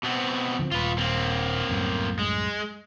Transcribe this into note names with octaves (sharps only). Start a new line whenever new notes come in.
B2 B3 C4
D3 F3 C4
D#1 F4 B4
A#3 C4
C2 F#2 A2
G#3